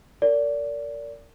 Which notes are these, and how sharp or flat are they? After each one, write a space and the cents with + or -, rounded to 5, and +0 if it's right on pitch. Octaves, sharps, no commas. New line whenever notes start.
A#4 -25 D5 -25